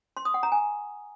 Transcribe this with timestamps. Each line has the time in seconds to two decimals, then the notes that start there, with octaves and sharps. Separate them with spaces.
0.17 C6
0.25 D#6
0.34 F#5
0.43 A#5
0.52 G#5